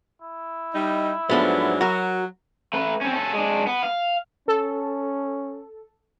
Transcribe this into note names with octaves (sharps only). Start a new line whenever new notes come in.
E4
G3 D#4
G#2 F3 F#3 A3 B3 D4
F#3 F#4 A#4
A3 B4
C4 C#4
C#4 A4
G#3 D4
B3
F5
C#4 A4